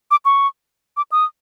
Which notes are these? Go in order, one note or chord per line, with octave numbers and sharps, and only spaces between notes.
D6
C#6
D6
D#6